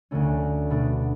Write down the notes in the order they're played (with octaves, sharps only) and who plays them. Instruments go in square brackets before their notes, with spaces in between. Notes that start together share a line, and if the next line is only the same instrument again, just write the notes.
[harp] D2 D3 A3 C#4
B2 A3 D4